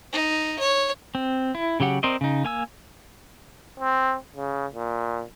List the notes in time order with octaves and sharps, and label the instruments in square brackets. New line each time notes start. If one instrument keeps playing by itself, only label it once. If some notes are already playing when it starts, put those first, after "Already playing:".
[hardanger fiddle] D#4
C#5
[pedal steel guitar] C4
E4
C#3 F#3 G4 F#5
C4 A#4 C5 D5 D#5
C#3 D#4
A#3 G#5 E6
[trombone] C4
C#3
A#2